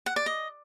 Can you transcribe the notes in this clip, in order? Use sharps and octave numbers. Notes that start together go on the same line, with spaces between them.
F#5
D5
D#5